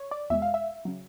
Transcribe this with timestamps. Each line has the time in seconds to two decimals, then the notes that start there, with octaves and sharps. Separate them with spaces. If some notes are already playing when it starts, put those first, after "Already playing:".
Already playing: C#5
0.11 D5
0.30 E2 B2 G#3 E5
0.42 F5
0.54 E5
0.85 C#3 F#3